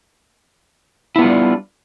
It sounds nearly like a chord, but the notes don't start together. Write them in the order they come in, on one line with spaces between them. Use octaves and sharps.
E4 B3 F4 G3 D4